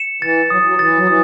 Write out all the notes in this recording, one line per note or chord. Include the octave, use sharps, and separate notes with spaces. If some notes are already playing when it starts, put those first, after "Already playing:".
Already playing: C#7 E7
E3 A6
F#3 D#6
F#3
E3 A6
F#3
E3 D#6